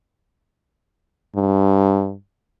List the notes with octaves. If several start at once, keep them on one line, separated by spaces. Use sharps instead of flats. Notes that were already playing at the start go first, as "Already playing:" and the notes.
G2